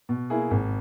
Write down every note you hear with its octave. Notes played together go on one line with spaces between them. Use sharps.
B2
A#3 E4 G#4
G#1